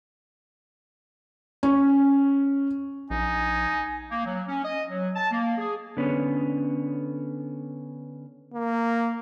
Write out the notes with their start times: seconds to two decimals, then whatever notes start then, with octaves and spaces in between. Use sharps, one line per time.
1.63 C#4
3.11 A#1 D#4 G#5
4.10 A#3
4.25 F#3
4.48 C#4
4.64 D#5
4.89 F#3
5.15 A5
5.31 A#3
5.58 G#4
5.97 D3 B3 C#4
8.54 A#3